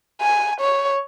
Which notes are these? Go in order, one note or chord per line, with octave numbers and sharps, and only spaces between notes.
G#5
C#5